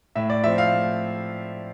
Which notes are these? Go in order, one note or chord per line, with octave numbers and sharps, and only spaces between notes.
A2 E5
D5
F3 C4 E5
F5
A2